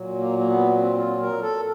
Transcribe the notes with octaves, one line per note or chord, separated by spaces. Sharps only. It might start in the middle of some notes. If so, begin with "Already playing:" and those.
Already playing: A#2 F#3
A#3
A#3
B3
C4
F4
A#4
A4